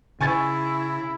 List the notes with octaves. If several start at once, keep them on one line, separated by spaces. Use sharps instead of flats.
C#3 E4 G#5 C#6 A6